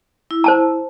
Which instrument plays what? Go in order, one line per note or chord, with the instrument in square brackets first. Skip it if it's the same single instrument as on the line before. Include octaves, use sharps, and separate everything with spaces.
[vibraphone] E4
[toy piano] C5 A5 A#5